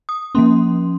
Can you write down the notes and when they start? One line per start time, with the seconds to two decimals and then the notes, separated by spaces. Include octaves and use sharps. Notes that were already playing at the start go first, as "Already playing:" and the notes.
0.09 D#6
0.35 F3 A#3 C#4 C6